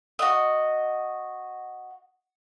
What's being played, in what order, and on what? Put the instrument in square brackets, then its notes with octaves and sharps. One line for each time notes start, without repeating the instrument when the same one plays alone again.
[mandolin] F#4 D#5